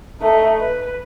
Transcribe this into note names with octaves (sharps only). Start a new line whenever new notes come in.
A3 D#4
B4